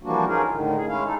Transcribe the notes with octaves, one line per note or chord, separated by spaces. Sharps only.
E3 F3 G3 A#3 D4 F#4
C#4 D#4 F4 G#4 A#4
A2 D3 D#3
G#4
G#3 C#4 E4 F5
D#4 A4